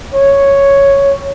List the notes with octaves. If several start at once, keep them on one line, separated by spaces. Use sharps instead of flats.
C#5